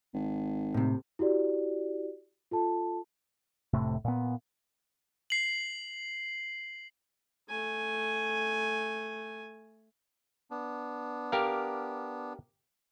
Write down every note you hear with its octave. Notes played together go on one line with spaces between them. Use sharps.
G#1
A2 C3
E4 F#4 G4 D5
F4 A4 A5
F1 A2 C3 A3
A#2 B3
C7 F#7
A3 G#5
B3 D4
G4 A#4 F5